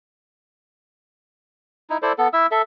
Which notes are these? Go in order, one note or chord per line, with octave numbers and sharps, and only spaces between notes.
D#4 E4
E4 A4 C5 D5
B3 A4
E4 E5 E6
A4 E5